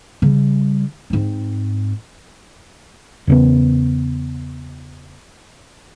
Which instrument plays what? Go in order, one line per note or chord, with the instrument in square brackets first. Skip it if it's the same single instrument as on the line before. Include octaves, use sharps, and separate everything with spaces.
[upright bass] C#3 G3
G#2 C4
[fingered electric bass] E2 C#3 B3